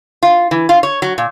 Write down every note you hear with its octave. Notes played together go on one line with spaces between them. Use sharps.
F4
E3
F4
C#5
F#3
A#2